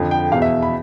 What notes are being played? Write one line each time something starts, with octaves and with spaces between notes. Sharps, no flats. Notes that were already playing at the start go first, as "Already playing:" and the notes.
Already playing: F2 D3 F3
G5
E2 B2 F5
E5
B5